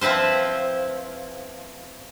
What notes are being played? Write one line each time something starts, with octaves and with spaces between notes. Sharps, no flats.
F3 C4 E4 B4 C5